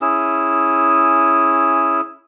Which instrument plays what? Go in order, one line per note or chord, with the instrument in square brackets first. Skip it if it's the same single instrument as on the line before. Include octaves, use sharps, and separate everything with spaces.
[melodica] C#4 E4 G#4 E6